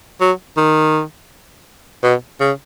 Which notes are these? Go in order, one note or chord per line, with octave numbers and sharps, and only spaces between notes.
F#3
D#3
B2
C#3